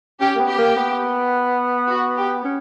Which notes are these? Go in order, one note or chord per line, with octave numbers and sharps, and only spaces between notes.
C#4 G4
A#3
B3
G4
A#3
B3
F#4
G4
C#4